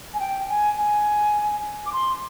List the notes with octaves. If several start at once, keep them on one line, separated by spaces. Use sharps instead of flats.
G#5
G5
G#5
G#5
D6
C6